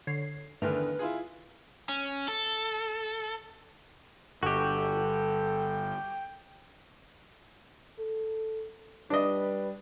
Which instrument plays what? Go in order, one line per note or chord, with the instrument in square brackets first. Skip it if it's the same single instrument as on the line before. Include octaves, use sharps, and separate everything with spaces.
[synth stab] D3 C#5 C7
[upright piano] E2 D3 D#3 [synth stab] G2 A3 F6 [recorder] B4
[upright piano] E4 F4 G#4
[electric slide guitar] C#4
A4
[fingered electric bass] G1 [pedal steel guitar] F#4 G4 [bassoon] A4 [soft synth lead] G5
[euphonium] A4
[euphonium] G3 [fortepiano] D4 D#5 [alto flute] B4